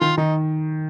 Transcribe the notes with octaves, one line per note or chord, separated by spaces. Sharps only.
D#3 F4
D#3 D#4